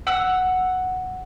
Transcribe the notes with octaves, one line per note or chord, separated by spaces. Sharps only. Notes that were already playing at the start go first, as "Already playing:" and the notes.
F#5 E6